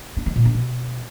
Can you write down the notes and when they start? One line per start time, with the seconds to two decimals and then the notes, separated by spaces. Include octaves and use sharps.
0.17 D4
0.26 G#3
0.36 A#2
0.45 D4
0.55 B2